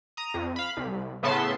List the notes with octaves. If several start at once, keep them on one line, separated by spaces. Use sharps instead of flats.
A#5 D#6
F2
F5 B5
C2
A2 C#3 B3 E5 A5 C6